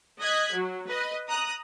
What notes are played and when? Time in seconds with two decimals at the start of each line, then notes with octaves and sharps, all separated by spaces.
0.20 D#5 F#6 G#6 B6
0.53 F#3
0.88 B4 D#5
1.28 A#5 D#6 F#6